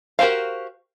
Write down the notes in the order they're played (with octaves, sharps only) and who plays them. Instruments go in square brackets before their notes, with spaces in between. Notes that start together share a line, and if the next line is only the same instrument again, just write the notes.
[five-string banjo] F#4 G4 A#4 C5 F5